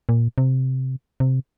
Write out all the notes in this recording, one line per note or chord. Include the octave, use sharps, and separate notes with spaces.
A#2
C3
C3